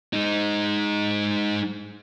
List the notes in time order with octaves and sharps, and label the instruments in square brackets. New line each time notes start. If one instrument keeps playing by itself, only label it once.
[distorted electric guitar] G#3 D#4